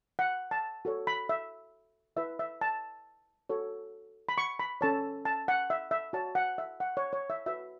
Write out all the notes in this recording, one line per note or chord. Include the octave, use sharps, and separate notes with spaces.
F#5
A5
F#4 A4 C#5
B5
E5
E4 B4 E5
E5
A5
F#4 A4 C#5
B5
C#6
B5
C#4 A4 C#5 A5
A5
F#5
E5
E5
F#4 C#5 A5
F#5
E5
F#5
C#5
C#5
E5
F#4 B4 E5